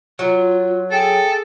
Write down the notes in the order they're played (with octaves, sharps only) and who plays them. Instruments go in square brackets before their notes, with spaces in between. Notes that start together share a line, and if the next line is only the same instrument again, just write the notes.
[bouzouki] F#3 [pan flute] F4
[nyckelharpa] G#4 [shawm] A4 [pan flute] G5